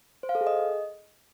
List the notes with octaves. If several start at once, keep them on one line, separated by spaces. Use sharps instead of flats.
C5
F5
A4
G#4
D#5